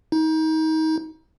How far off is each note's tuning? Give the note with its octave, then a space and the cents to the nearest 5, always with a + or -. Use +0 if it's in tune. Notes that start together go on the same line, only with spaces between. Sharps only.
D#4 +30